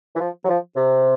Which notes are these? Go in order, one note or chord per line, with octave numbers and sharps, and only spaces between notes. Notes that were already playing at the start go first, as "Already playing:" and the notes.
E3
F3
F#3
F3
C3